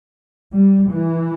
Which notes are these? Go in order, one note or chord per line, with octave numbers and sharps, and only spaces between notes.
G3
E3